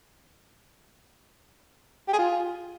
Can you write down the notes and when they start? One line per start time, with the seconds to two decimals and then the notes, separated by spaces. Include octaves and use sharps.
2.08 G4
2.13 G#4
2.19 F4